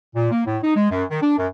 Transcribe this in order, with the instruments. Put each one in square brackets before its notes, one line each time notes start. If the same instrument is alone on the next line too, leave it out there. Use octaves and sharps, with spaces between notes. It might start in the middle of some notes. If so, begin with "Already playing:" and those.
[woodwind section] A#2
A#3
A2
D#4
G#3
F#2
D#3
D4
F#2